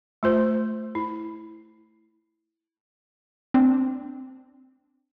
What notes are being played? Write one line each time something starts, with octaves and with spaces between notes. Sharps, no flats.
A3 F4 C5
E4
C4 D4